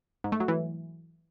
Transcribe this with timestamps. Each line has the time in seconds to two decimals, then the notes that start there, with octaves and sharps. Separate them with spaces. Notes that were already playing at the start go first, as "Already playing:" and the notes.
0.24 G#2
0.32 A3
0.40 F#3
0.48 E3